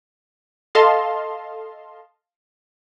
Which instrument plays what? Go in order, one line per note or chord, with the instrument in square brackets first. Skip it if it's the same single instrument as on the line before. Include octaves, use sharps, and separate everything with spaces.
[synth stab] A4 D#5 F5 A5 C6